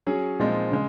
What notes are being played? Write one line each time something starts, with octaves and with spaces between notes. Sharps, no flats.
F#3 C#4 G#4
A#2 F3 G#3 C4 D#4
C#3 G#3